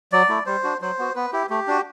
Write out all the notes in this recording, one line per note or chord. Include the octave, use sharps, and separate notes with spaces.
F#3 D5
A3 E4
G3 C5
D4 F#4
F#3 C5
B3 F#4
B3 B4
E4 G4
A3 G4
D4 F#4